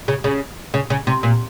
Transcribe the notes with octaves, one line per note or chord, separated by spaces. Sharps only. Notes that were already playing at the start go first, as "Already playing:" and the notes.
C#3
C#3
C#3
C#3
C3
A#2